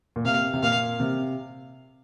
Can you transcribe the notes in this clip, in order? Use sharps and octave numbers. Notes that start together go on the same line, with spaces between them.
A#2
C3 F5
C3
A#2 F5
C3